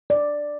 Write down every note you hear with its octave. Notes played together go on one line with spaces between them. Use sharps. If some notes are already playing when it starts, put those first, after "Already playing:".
D5